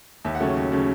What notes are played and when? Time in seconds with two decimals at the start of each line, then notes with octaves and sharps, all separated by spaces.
0.25 D#2 E5
0.35 F#5
0.40 C#3 F#3 A3 C#4
0.57 D#2
0.72 C#3 F#3 A3 C#4